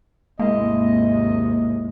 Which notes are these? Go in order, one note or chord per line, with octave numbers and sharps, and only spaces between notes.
G#1 D#2 C3 G#3 A#3 E4 D#5